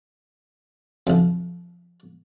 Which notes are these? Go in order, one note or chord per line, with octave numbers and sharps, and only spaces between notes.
B1 F2